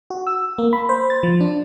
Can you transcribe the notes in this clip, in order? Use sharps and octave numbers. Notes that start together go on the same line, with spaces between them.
F#4
E6
A#3
B5
C5
A6
F3
D4